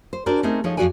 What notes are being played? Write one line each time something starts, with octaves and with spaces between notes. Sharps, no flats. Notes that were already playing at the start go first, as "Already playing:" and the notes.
C5
D4 F#4 G#4 A#4 C5 D5
A3 C4 C#4 D#4 G#4 A#4
F3 G#3 D#4 A4 C#5 D#5
F2 B2 F#4 G#4 D5 G#5